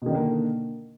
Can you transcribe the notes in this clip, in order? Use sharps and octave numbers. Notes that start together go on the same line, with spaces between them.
B2 D3 D#3 A#3